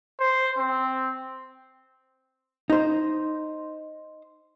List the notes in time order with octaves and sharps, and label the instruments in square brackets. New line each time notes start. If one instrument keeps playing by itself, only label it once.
[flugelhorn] C5
C4
[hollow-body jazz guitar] D#4 C5